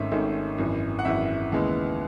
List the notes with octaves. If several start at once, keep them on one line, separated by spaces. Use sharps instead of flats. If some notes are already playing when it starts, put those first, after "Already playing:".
Already playing: G#1 G#2 D#3 A3 C#4 E5
G#1 G#2 D#3 A3 C#4
G#1 F#2 E3
F#5
G#1 F#2 E3 E5
D#2 C#3 E3 G#3 B3